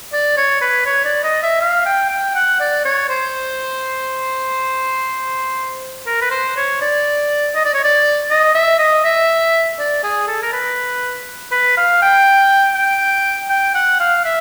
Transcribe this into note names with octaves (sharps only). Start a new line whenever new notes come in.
D5
C#5
B4
C#5
D5
D#5
E5
F5
G5
G5
F#5
D5
C#5
C5
A#4
B4
C5
C#5
D5
D#5
D5
C#5
D5
D#5
E5
D#5
E5
D5
G#4
A4
A#4
B4
B4
F5
G5
G5
G5
F#5
F5
E5